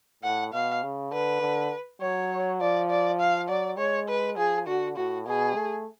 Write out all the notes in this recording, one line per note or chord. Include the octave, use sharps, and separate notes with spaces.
A2 F#5
B2 F5
C#3
D3 B4
D3
F#3 C#5
F3 D5
D5
F5
F#3 D5
G#3 C#5
B4
F3 G#4
D3 F#4
A2 F#4
B2 G#4
A3